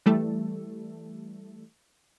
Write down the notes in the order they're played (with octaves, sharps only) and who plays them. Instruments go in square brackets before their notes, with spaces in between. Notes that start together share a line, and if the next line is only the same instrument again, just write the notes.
[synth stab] E3 G3 A3 A4